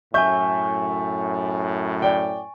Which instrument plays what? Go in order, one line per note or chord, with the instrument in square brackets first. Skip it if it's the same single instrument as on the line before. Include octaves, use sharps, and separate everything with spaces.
[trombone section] F#2 A2 [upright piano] E5 G6 [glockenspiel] G#5 C#6
[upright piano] D5 G5